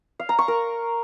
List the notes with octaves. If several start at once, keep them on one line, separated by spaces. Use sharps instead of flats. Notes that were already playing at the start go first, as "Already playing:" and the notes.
F5
A#5
C#6
A#4